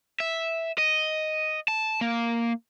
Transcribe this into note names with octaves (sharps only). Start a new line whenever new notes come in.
E5
D#5
A5
A#3